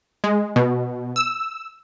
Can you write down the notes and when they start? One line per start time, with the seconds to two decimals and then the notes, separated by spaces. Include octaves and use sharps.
0.24 G#3
0.56 B2
1.16 E6